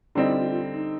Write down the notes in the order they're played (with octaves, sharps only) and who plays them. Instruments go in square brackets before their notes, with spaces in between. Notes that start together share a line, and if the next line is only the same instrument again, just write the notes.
[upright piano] D3 G3 C4 D#4 [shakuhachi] E4
[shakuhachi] E4
F4
F4
D#4